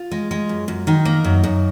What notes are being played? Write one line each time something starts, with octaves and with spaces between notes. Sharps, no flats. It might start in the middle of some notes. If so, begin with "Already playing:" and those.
Already playing: F4
G#3
G#3
F#2
F#2
D#3 D#4
A#3
F#2
F#2